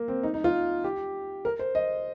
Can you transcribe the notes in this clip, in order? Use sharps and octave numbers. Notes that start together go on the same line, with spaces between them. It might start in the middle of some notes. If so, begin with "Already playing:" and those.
Already playing: A#3
C4
D#4
D#4
F4
G4
A#4
C5
D#5